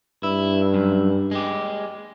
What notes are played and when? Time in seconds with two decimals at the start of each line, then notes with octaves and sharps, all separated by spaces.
0.23 G2 E4
0.74 F#2
1.31 G#3 G4